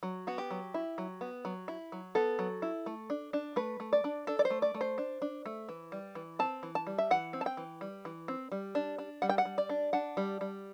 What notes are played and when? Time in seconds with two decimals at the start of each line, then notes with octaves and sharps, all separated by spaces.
0.03 F#3
0.27 B3 F#4
0.38 G4
0.51 F#3
0.74 E4
0.98 F#3
1.21 B3
1.45 F#3
1.68 E4
1.92 F#3
2.15 B3 A4
2.39 F#3
2.62 E4
2.86 A3
3.10 D4
3.33 D4
3.56 A3 B4
3.80 A3
3.93 D5
4.04 D4
4.27 D4 A4
4.39 D5
4.45 C5
4.50 A3
4.62 D5
4.74 A3
4.81 C5
4.98 D4
5.22 D4
5.46 A3
5.69 E3
5.92 G3
6.15 E3
6.39 C4 A5
6.63 E3
6.75 A5
6.87 G3
6.98 E5
7.11 E3 F#5
7.33 C4
7.41 A5
7.46 G5
7.57 E3
7.81 G3
8.05 E3
8.28 C4
8.52 G3
8.75 D4
8.98 D4
9.22 G3 F#5
9.29 G5
9.38 F#5
9.45 G3
9.58 D5
9.69 D4
9.93 D4 F#5
10.17 G3
10.41 G3